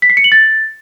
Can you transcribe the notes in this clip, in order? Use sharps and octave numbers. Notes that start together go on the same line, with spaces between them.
B6
C7
C#7
F#7
A6